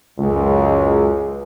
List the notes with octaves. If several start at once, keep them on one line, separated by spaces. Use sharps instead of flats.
C#2 F#2 G#3